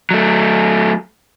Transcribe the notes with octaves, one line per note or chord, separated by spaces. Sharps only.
F#3 A3